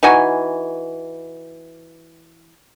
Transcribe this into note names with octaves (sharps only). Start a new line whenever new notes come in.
E3 D#4 F#4 G#5